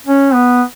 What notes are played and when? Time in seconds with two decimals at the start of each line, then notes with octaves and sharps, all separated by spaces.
0.06 C#4
0.34 B3